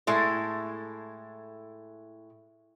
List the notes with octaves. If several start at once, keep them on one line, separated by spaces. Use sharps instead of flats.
A2 G#3 E4 A4